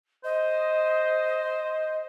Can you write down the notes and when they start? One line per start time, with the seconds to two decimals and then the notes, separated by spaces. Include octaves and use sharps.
0.24 C5 D#5